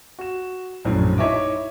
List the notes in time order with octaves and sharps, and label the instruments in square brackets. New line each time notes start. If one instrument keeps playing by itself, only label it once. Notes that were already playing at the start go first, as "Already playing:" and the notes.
[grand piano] F#4 E7
A#1 F#2 A2
D#4 E4 C#5 D#5 E5 D6